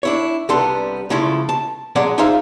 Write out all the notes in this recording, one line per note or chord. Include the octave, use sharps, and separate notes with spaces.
D4 E4 C#5
C2 G3 B3 D4 A4 C6
C#3 F3 G#3 A3 E4
A5
F3 F#3 G#3 C#4 D5 F#5
D#4 F4 G#4 C5 E5 F5